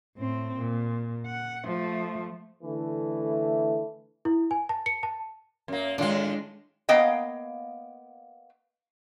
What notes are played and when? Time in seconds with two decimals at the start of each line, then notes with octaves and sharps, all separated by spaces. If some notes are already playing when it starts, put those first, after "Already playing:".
0.17 A2 C4
0.58 A#2
1.27 F#5
1.65 F3 A3
2.64 D3 E3 A3
4.25 E4
4.51 G#5
4.69 A5
4.86 C#7
5.03 A5
5.68 F#2 A#3
5.98 A2 D#3 G#3 D4 F4
6.89 A#3 B3 D#5 F5 G5